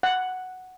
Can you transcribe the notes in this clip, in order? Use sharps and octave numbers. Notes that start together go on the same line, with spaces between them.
F#5